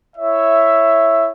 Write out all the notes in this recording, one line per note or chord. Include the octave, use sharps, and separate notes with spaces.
E4 C#5 E5